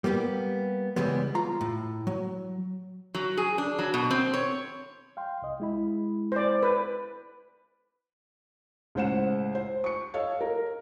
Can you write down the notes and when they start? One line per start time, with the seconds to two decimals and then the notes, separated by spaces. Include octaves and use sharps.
0.04 G3 A#3 B3 G4
0.96 C#3 E3 G3 G#3 B3
1.35 F4 A#5
1.61 A2
2.07 F#3
3.15 F#3
3.37 G#4
3.58 D4
3.79 F#3
3.94 B2
4.11 C4
4.34 C#5
5.17 F5 G5 C6
5.42 C2 D#5
5.60 G#3 E4 B5
6.32 C5 D5
6.63 B4
8.95 C#2 A2 C5 F#5 E7
9.55 C5
9.84 C#6 C#7
10.14 A4 C#5 D#5 F5
10.41 A#4